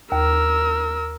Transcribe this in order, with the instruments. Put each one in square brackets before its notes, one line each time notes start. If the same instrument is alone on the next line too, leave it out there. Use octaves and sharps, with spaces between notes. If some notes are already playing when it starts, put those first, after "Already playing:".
[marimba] D#2 [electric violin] A#4 E6